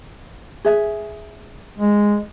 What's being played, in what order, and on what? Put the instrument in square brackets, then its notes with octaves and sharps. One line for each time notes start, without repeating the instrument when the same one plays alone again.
[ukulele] G#4 E5
[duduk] G#3